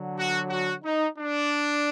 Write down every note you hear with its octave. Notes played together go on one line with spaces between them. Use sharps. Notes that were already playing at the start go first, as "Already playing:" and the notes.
Already playing: D3 F#3
F#4
F#4
D#4
D4